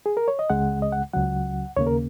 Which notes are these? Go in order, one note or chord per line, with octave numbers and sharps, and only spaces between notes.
G#4
A#4
C#5
D#5
C#2 C#3 G#3 F#5
D#5
F#5
C#2 C#3 F#3 F#5
D#2 C#3 A#3 C#5
A#4